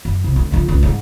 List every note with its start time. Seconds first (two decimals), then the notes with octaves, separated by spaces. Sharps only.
0.05 F#2
0.24 C2
0.36 D2
0.52 D3 F3
0.68 D#1 C#2
0.83 G#2 G3